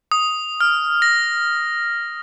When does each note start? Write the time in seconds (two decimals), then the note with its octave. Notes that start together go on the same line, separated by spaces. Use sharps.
0.11 D#6
0.61 F6
1.02 A#6